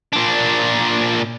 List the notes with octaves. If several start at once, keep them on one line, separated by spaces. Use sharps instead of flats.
A#2 D4